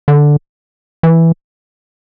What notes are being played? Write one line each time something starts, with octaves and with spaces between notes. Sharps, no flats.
D3
E3